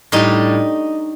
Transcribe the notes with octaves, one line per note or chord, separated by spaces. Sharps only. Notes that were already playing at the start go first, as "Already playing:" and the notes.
A2 G3 D4 D#4